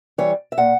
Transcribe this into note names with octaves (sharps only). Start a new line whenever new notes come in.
E3 G3 C#5
E5
A#2 F#5